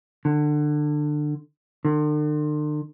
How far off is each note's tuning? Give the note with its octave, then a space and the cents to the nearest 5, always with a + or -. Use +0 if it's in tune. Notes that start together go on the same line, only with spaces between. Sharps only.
D3 +25
D3 +45